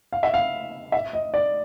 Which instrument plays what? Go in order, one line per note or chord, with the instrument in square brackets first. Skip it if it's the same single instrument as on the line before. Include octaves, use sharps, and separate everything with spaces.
[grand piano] F5
E5
F5
E5
D#5
D5